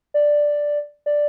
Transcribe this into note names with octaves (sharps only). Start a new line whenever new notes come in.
D5
D5